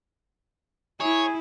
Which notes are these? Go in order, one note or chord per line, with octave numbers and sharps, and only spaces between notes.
E4 G#4 C#5